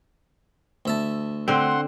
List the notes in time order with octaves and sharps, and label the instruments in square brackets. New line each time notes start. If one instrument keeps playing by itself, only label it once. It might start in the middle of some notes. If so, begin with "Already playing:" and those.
[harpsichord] D2 E5 A5
[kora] D3 C4 [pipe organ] F#5 C6